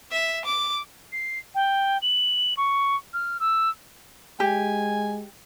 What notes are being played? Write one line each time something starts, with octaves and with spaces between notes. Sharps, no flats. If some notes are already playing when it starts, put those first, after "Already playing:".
E5
D6
C7
G5
F#7
C#6
F6
E6
G#3 G4 G#5